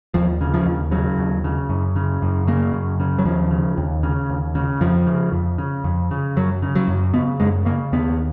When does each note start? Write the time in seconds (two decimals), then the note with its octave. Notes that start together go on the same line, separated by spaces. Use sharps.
0.14 D#2 F3
0.41 C#3
0.54 F3
0.66 D#2
0.91 C#3 F#3
1.18 D#2
1.44 C#3
1.69 F#2
1.96 C#3
2.22 F#2
2.47 C#3 A#3
2.73 F#2
3.00 C#3
3.19 F#3
3.25 D#2 F3
3.51 C#3
3.78 D#2
4.03 C#3
4.30 D#2
4.55 C#3
4.81 F2 F3
5.07 C#3
5.32 F2
5.58 C#3
5.84 F2
6.11 C#3
6.36 F#2 F#3
6.62 C#3
6.75 F#3
6.88 F#2
7.14 C#3 B3
7.40 F#2 G#3
7.65 C#3 A#3
7.92 D#2 B3